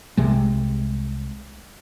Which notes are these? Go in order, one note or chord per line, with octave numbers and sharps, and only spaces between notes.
C2 C3 G#3